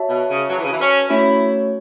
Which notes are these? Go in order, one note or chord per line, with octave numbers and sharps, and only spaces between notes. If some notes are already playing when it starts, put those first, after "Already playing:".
Already playing: F#4 C#5 E5 A5
B2
C#3
F#3 F#4 B4 A5
E3
C#3
E3
C#4
A3 C#4 E4 F#4 C#5